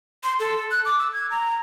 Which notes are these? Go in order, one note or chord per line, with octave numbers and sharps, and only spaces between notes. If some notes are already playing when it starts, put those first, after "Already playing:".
C6
A4
F#6
D6
E6
G#6
A#5